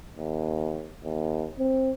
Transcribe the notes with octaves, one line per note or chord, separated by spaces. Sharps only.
D#2
D#2
C4